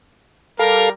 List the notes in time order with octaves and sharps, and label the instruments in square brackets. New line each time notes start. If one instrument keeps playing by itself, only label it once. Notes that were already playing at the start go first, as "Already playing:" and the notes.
[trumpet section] G3 A#4 [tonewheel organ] A4 F5